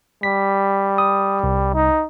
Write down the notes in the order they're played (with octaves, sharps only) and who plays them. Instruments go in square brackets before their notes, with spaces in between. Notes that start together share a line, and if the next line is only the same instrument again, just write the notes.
[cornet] G3 [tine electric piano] B6
[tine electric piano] D#6
C2
[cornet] D#4